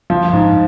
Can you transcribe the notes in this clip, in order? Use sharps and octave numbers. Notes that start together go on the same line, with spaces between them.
F3
G#2